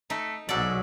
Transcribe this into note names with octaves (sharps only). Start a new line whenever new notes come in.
A3 D#4
B1 G#2 F#3 A4 D5